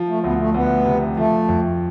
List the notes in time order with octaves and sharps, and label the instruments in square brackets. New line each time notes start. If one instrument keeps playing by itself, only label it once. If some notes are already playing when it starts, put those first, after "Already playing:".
Already playing: [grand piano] F3
[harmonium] A3
[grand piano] D2 [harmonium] B3
[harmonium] A3
[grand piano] D2 [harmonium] B3
[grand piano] C3
[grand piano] F3 [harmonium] A3
[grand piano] F2